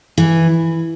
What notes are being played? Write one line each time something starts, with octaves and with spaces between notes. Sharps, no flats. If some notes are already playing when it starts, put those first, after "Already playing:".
E3